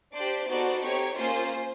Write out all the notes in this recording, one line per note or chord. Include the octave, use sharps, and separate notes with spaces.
D4 G4 C5 D5
B3 D#4 F#4 A4 C5 D5
C4 D#4 G4 C#5
A#3 C#4 F4 G#4 C5